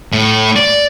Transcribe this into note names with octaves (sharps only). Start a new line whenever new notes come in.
A2
D5